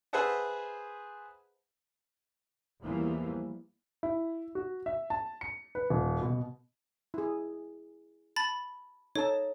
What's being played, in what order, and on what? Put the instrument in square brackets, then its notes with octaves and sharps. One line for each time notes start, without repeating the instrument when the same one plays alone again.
[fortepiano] G#4 B4 C5 E5 F#5 A5
[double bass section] E2 E3 F3 G3 A#3
[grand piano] E4
F#4
E5
A5
C#7
B4
D#1
B2
[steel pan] E4 G#4
[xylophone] A5 B5 A6
[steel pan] D#4 A4 A5 [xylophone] C#5